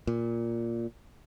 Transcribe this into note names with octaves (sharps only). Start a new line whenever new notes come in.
A#2